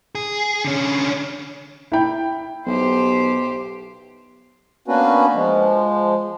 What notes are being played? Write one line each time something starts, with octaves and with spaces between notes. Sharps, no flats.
G#4
D3 C#4
E4 G5
B1 G4 C5
A#3 B3 C#4 D4 F#4 B4
F3 G#3